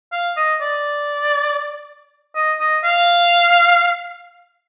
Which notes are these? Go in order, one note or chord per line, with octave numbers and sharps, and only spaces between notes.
F5
D#5
D5
D#5
D#5
F5